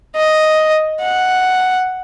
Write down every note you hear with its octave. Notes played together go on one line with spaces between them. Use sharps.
D#5
F#5